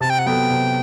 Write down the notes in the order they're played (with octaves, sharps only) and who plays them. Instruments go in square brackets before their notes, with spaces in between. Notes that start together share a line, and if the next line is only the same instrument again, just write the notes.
[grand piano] C3 [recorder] A5
[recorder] G5
F#5
[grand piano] F#3 B3 F#4 A4 [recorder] G5
[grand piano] C3